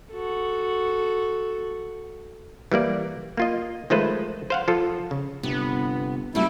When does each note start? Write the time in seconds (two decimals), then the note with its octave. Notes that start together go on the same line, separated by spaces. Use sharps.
0.12 F#4 A4
2.72 E3 G3 A#3 D5
3.37 A#3 F4 D#5
3.90 D#3 F3 G#3 A3 B4 C5
4.50 C5 F5 F#5
4.68 F3 F4 A4
5.11 C#3
5.43 G1 C3 B3
6.35 F#1 G3 A3 E4 F#4